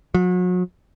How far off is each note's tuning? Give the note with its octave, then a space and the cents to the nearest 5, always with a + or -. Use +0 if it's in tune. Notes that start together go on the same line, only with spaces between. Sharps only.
F#3 -35